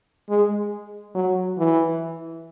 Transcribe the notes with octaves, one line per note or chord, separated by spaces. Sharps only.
G#3
F#3
E3